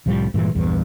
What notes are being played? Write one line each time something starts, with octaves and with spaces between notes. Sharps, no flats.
C2 A2 F3 G3
G2 A#2 E3 G#3
A#1 E2 G2